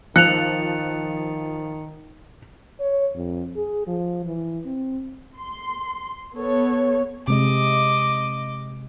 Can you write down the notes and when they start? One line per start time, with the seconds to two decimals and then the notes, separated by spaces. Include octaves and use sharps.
0.16 D#3 F3 F#6 C#7 F7
2.80 C#5
3.15 F2
3.56 G#4
3.87 F3
4.25 E3
4.65 C4
5.37 C6
6.36 B3 A4 C#5
7.28 C3 G#3 D#5 D6